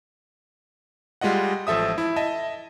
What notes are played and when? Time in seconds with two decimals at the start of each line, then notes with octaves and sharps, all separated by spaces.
1.21 G3 G#3 F4 D#5 F#5
1.67 A1 F3 A4 E5 D#6
1.98 E4
2.16 D#5 E5 A5